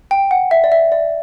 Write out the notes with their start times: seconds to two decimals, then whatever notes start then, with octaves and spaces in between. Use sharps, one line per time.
0.11 G5
0.31 F#5
0.51 E5
0.64 D5
0.72 E5
0.92 D5